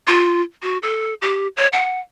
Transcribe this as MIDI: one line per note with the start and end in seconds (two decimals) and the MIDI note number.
0.08 0.41 65
0.62 0.78 66
0.83 1.14 69
1.22 1.47 67
1.57 1.67 73
1.73 1.99 78